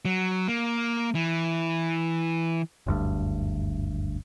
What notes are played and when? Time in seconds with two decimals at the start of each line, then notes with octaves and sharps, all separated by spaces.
0.05 F#3
0.48 A#3
1.15 E3
2.87 F#1 D2 G2